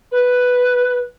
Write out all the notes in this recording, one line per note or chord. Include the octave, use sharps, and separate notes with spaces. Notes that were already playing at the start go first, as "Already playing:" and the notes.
B4